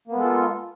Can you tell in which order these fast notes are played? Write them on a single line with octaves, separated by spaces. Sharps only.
A#3 B3 G#3 A4 F4